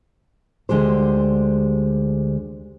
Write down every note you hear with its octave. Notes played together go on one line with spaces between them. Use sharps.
D2 D3 G#3 G4 C5